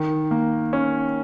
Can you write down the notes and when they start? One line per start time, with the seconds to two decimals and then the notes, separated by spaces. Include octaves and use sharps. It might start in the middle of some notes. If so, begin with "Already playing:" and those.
Already playing: D#3
0.31 A#3
0.73 C#4